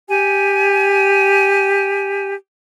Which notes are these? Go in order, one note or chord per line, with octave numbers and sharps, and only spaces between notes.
G4 G#5